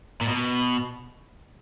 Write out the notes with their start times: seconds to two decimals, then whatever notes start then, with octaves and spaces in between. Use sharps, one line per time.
0.21 A#2
0.28 B2